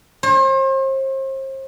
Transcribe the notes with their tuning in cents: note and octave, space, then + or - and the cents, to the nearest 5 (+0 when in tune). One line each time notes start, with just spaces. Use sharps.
C5 +40